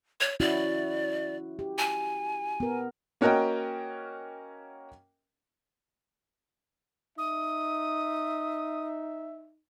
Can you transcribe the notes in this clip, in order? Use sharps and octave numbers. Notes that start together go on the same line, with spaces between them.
C#5
C#4 E4 F#4 D5
G4
G#5
B3 A#4
A#3 C#4 F#4 A#4 D#5 G5
D#4 E5 D#6